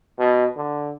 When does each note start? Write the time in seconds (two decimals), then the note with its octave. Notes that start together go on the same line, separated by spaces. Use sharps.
0.19 B2
0.56 D3